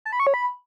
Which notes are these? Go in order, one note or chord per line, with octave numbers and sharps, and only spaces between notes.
A5
B5
C#6
C#5
B5